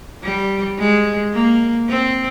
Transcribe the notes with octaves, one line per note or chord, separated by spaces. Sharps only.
G3
G#3
A#3
C4